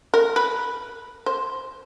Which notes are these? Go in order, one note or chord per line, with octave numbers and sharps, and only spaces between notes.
A#4
B4
C5